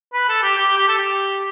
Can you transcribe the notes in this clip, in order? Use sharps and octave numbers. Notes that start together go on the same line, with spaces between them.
B4
A4
G4
G4
G4
A4
G4